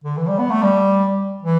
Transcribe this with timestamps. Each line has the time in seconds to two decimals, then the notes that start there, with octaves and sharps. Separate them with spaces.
0.04 D3
0.17 E3
0.28 G3
0.39 B3
0.50 A3
0.62 G3
1.43 E3